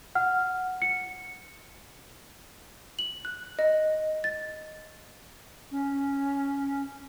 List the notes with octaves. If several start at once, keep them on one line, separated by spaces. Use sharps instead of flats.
F#5 F6
C#7
F#7
F#6
D#5
A6
C#4